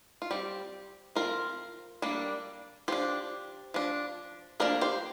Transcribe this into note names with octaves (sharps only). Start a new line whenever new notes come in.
F4
G3 C4 G4
F3 C4 F4 A#4
G3 A#3 D4
F3 D4 G4 C5
F3 D4
F3 A#3 D4 A#4 D5
G4 C5